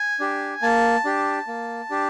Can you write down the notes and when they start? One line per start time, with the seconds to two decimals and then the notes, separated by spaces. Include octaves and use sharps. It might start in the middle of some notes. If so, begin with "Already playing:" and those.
Already playing: G#5
0.20 D4 G4
0.62 A#3 A5
1.05 D4 G4
1.47 A#3
1.90 D4 G4